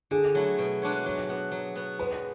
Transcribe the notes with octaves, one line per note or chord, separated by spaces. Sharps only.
D3 G#4
F#3 A3 E4
B2
G#3 D4 F#4 C#5
F#3
B3 F#4
F#3
B3 F#4
G#3 B4